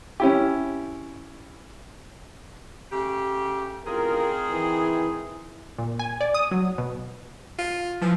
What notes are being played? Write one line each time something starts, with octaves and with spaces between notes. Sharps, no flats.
C#4 E4 G4
C#3 A3 G4
A1 D#3 C4 F4 G#4 A#4
E3
A#2
G#5
D5
D#6
F#3
B2
F4
E3 F3